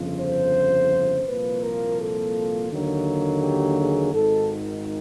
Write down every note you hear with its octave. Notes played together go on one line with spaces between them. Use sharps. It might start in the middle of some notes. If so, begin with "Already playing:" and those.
Already playing: G1 F2 C#3 F3
C5
C2 A#2 F3 A#3 B4
A#4
A4
D#2 D3 F#3 A#3
G4
G#4
G#1 G#2 D#3 A4